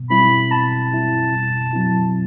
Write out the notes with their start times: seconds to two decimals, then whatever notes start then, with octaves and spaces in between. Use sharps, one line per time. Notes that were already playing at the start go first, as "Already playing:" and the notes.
Already playing: B2
0.10 G3 C4 E4 B5
0.51 B2 A5
0.92 G3 C4 E4
1.33 B2
1.73 F#3 C4 E4